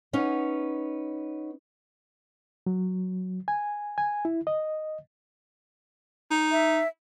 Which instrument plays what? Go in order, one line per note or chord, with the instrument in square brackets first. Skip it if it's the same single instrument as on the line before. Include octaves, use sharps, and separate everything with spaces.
[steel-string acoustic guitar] B3 C#4 D#4
[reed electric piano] F#3
G#5
G#5
E4
D#5
[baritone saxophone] D#4
[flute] E5